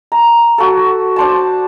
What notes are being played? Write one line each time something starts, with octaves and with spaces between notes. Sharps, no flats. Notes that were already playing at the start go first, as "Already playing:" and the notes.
A#5
F#4 A4
D4 C5 A5